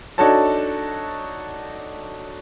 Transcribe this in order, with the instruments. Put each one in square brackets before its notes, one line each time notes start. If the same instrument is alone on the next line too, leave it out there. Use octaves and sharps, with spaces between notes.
[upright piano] D4 D#4 F#4 A4 C#5 A5